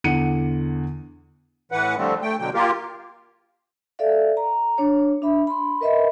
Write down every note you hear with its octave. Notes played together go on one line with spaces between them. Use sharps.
E2 D3 F#5 C#7 D#7
A2 E3 B4 F#5
D3 F3 G3 A3 C4
A3 G5
B2 D3 F#3 G5
A#3 F4 G4 A#4
A4 D5 E5 F5
A#5
D4 C#5
D4 E5 B5
B5 C6
A#4 B4 D#5 E5 B5